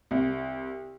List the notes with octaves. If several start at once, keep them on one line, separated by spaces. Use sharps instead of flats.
C2